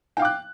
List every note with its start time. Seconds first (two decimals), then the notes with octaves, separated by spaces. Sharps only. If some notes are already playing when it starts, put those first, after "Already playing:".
0.17 G5
0.19 F5
0.22 D6
0.25 F#6